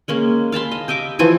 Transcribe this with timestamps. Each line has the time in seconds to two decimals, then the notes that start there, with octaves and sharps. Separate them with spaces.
0.08 G#3 A#3 C#4
0.52 F5 A5 B5 C6
0.71 D#5
0.88 G4 D#5 E5 D6
1.19 E3 F3 G#5 C#6